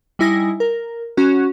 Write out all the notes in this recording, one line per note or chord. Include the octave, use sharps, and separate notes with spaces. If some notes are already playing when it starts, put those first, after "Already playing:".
G3 D#4 E4 G#5 A#6
A#4
C#4 F#4